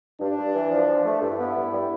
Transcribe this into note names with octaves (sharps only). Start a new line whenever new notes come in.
G2 D4
G2
E3
F3
F3
A3
G2 E4
B3
G2
G3